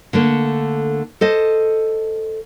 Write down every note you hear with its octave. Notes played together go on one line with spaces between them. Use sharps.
D3 A3 A#3
A4 C5 D#5